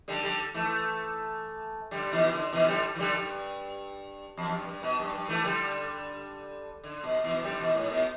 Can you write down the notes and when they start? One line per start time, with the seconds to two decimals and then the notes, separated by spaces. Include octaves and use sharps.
0.08 D3 G3
0.23 D3 G3
0.54 E3 A3
1.91 D3 G3
2.12 B2 E3
2.32 D3
2.53 B2 E3
2.68 D3 G3
2.95 E3
2.99 D3 G3
3.14 G2
4.37 E2
4.52 G2
4.68 G2
4.83 B2
4.99 G2
5.15 G2
5.29 E3 A3
5.44 D3 G3
6.83 D3
7.03 B2
7.24 B2 E3
7.44 D3 G3
7.60 B2 E3
7.75 A2
7.90 B2